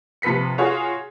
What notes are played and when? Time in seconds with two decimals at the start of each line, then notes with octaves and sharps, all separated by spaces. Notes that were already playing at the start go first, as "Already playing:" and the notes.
0.22 C3 F3 B4 B6 C#7
0.58 F4 F#4 G#4 C#5